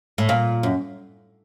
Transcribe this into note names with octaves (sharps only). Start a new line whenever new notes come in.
A2
A#2
F#2